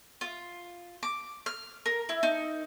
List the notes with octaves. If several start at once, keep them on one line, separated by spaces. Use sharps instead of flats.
F4
D6
F6
A#4
E4
D#4